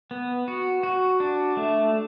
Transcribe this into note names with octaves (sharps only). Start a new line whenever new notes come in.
B3
F#4
F#4
D4
A3